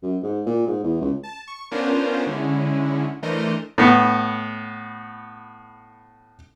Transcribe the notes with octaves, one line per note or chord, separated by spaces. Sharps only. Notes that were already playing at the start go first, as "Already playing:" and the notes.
F#2
G#2
A#2
G#2
E2
C#2
A5
C#6
B3 C#4 D4 F4 A#4 C5
D3 G#3 C#4 E4
E3 A3 D4 A#4 C5 D#5
A2 B3